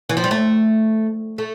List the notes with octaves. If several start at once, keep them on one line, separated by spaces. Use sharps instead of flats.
E3
F3
G3
A3
A3